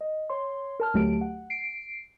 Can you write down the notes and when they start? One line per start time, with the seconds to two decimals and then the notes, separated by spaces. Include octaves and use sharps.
0.01 D#5
0.30 C#5 C6
0.80 A#4 A5 F6
0.94 D2 F#3 A3 G4 A5 D7
1.21 F#5
1.50 C7 D7